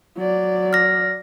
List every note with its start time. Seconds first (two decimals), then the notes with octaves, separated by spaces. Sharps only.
0.17 F#3 D5
0.73 F6 A#6